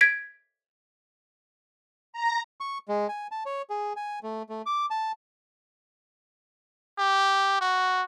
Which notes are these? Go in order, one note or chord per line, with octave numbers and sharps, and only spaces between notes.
G#6 B6 D7
A#5
C#6
G#3
G#5
A5
C#5
G#4
G#5
A3
A3
D6
A5
G4
F#4